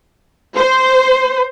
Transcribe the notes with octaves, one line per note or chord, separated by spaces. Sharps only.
C5